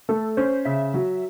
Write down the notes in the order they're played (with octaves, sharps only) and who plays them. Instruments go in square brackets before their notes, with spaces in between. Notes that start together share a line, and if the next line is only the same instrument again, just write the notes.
[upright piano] A3 [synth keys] A4
[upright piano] C#4 [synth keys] C5
[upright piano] C#3 [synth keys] E5
[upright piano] F#3